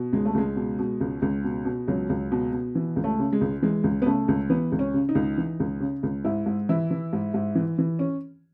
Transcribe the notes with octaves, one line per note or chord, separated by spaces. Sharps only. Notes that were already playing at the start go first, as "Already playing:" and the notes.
Already playing: B2
C#2 G#3
A3
C#2 G#3
B2
B2
C#2
C#2
B2
B2
C#2 F#3
C#2
B2
B2
E3
C#2
A3
C#3
G#3
C#2
E3 G#3
C#2
B3
C#3 A3
C#2
E3 B3
C#2
C#4
C#3
D#4
C#2
E3
C#2
C#3
C#2
G#2 E4
G#2
E3 E4
E3
G#2
G#2
E3
E3
C#4